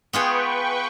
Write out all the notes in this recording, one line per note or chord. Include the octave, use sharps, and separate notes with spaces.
B3 F4 G#4 B4 G5 C#6